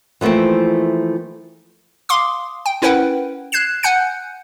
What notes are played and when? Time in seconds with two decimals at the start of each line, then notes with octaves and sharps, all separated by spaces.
0.21 E3 F3 A3 A#3 C4
2.09 F5 C6 D6 D#6
2.66 G5
2.82 C#4 E4 A#4 B4 F#5 G5
3.52 F#6 G#6 C7 E7
3.83 F#5 G#5 F#6 G6 C#7